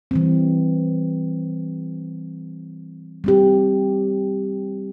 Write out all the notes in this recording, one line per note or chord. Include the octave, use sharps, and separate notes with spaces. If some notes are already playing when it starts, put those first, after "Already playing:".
E3 G3 C4
G3 C4 G4